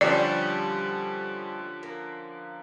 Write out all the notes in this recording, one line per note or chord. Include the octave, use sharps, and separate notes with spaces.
D3 F3 G3 A3 C#4 D5
A#3